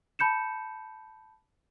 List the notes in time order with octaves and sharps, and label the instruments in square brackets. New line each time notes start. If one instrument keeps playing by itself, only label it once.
[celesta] A5 B5 G6 C#7 E7